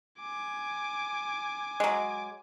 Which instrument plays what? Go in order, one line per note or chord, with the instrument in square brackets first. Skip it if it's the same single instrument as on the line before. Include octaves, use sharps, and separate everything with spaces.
[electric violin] G#5 D6
[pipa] F#3 G#3